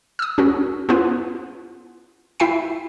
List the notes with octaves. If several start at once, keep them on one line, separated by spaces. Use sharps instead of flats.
D#6 E6
C#4 F#4 A#4
B3 C#4 E4 F4 B4
E4 E5 G5 C7